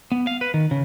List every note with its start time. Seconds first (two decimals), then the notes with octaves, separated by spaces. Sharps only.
0.12 B3
0.27 F5
0.41 B4
0.54 D#3
0.71 C#3